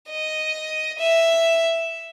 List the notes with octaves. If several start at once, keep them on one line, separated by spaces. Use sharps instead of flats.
D#5
E5